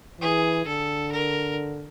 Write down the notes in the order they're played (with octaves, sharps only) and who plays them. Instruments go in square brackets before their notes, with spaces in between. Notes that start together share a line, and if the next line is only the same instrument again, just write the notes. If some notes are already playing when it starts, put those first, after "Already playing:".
[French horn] E3 [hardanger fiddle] G#4
[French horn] D3 [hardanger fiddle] A4
[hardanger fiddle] A#4